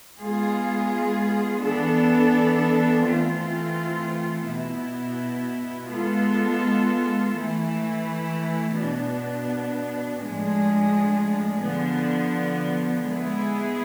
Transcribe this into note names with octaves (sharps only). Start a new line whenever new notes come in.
G#3 B3 F4 G#4
E3 B3 D4 A4
E3 A3 C4 F4
B2 B3 E4
G#3 B3 F4 A4
E3 A3 E4
B2 B3 D4
A2 F3 G#3 D4 G#4
D3 F3 B3
G#3 B3 E4 G#4